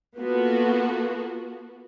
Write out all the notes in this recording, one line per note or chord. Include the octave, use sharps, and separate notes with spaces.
A#3 B3 F4 F#4 A4